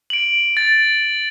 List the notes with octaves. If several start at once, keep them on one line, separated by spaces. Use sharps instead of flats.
D7 F#7
A6